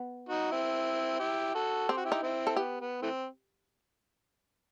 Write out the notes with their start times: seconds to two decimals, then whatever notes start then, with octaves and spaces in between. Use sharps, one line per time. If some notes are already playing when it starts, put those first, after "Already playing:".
Already playing: B3
0.29 D#4 F#4
0.51 C4 E4
1.20 E4 G4
1.54 F#4 A4
1.88 C4 G4
1.97 F#4
2.04 E4 G4
2.12 D#4
2.22 C4 E4
2.47 A4
2.56 B3 G4
2.80 B3
3.02 E3 A3 C4